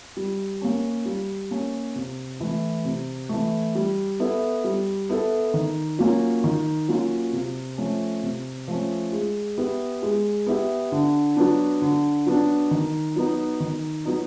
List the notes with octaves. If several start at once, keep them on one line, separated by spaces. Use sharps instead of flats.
G3
A#3 C#4
G3
A#3 C#4
C3
E3 A3
C3
E3 A3
G3
B3 E4 A4
G3
B3 E4 A4
D#3
F#3 A#3 C#4 F4
D#3
F#3 A#3 C#4 F4
C3
F3 A3 C#4
C3
F3 A3 C#4
G#3
B3 E4 G4
G#3
B3 E4 G4
D3
F#3 B3 D4
D3
F#3 B3 D4
D#3
F#3 B3 D#4
D#3
F#3 B3 D#4